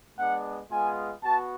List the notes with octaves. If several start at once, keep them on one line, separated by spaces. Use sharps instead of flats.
G#3 B3 D4 F#5
G#3 B3 F4 G#5
B3 F#4 A5